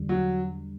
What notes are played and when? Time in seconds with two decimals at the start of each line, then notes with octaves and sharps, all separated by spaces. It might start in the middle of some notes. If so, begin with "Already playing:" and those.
Already playing: E2 D3 G3
0.09 F#3